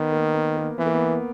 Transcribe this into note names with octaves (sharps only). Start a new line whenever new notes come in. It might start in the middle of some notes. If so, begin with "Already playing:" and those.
Already playing: D#3 B3
A#3
B3
A#3
E3 B3
A#3
B3